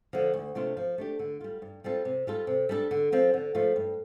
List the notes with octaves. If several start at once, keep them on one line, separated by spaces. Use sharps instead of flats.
D3 F3
D2
C3 A3 D4 F4
F3
A3 D4 G4
D3
G3 F4
G2
G3 C4 F4 A4
C3
G3 F4 A4
C3
G3 D4 A4
D3
F3 C4
D3
F3 A3 F4 A4
G2